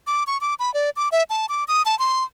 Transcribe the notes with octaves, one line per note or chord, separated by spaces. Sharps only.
D6
C#6
D6
B5
D5
D6
E5
A5
D6
D#6
A5
C6